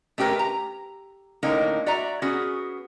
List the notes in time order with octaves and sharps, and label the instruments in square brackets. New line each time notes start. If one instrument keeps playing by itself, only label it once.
[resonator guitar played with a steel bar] A3 C#4 G4 G#4 A#4 B4
A#5
A2 D3 A#3 C#4 D#4
F#4 D5 E5 A#5
B3 C#4 F#4 G#4